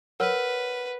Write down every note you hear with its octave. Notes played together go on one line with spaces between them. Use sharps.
A#4 B4 C#5 F#5 F6